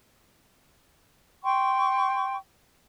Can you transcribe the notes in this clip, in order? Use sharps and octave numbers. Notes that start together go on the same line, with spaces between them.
G5 C6 C#6